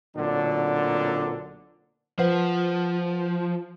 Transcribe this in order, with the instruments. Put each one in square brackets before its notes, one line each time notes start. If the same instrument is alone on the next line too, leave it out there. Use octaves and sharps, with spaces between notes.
[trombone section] B1 A#2 D3 F#3 C4 D4
[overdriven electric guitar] F3 [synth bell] B4 C5 F#5